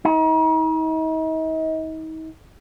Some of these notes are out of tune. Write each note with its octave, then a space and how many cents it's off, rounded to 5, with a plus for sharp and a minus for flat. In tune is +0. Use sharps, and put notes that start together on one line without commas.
D#4 +40